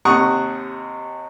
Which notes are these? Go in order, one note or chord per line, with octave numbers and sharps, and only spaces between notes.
D#2 C3 F#5 A#5 C#6 D#6